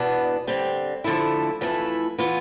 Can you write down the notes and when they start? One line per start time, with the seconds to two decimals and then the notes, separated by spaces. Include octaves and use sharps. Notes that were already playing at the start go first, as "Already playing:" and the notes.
Already playing: E2 B2 B3 D4
0.47 D3 G3 C4
1.04 D3 F3 A3 E4 A4
1.61 F2 E3 A3 E4
2.18 E3 B3 F4